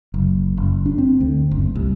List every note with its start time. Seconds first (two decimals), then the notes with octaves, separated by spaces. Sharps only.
0.14 F#1
0.57 F#1
0.86 D4
0.98 C4
1.20 D2
1.51 F#1
1.75 C2